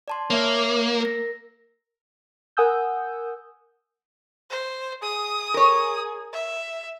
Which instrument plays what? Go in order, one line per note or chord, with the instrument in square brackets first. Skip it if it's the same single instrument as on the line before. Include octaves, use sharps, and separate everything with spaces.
[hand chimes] D5 A5 C6
[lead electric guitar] A#3 [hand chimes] C#5 E5
[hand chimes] A#4 A#6
[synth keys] A#4 F#5 G#5 D#6 E6 G6
[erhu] C5
[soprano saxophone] G#4 [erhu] D#6
[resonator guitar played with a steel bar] A#4 C#5
[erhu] E5